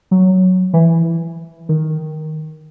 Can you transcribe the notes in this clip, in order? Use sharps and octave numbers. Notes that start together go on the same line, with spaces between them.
F#3
E3
D#3